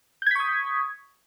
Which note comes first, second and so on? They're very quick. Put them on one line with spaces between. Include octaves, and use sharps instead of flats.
G6 G#6 B6 C#6 D#6